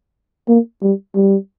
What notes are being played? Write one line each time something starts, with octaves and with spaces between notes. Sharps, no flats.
A#3
G3
G3